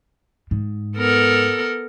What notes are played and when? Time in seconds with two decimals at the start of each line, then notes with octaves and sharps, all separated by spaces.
0.51 G#2
0.97 B3 A4 A#4